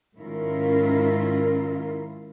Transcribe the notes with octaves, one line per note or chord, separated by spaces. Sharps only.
G#2 D#3 C#4 E4 F4 A#4